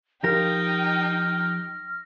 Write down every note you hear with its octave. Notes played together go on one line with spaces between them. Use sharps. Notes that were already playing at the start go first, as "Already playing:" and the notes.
F3 D#4 G4 A#4 G5 F6 A#6